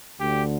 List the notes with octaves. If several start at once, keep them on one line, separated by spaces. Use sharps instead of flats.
D2 D3 G4